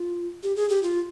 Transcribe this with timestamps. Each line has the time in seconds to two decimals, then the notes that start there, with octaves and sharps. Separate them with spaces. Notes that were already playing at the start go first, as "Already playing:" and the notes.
Already playing: F4
0.43 G4
0.56 G#4
0.70 G4
0.83 F4